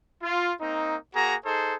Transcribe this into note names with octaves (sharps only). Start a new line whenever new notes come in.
F4
A#3 C4 D#4
A#3 F#4 G#4 A#5
D#4 G#4 A4 C5